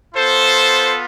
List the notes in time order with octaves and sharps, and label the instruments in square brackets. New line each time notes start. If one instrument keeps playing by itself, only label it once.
[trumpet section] B3 F4 A4 C5